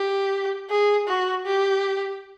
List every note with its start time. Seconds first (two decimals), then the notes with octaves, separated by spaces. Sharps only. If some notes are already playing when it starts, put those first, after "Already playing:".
Already playing: G4
0.70 G#4
1.08 F#4
1.46 G4